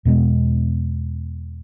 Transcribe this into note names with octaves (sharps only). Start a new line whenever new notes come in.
E2 B2 G#3